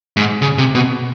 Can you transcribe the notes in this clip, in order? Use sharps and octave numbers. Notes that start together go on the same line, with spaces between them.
G#2
C#3
C3
B2